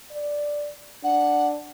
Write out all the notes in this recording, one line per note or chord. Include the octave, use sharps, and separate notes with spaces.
D5
D4 F#5